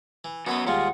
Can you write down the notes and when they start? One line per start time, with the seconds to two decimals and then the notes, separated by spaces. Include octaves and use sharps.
0.24 E3
0.46 F#2 B3 F#4 B4 D#5
0.67 D#2 G3 G#3 F4 F#5